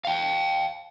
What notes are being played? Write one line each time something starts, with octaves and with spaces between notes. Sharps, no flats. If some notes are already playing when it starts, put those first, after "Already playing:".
F5 G5